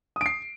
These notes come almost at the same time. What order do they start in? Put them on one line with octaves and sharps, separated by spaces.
D#6 D7 C7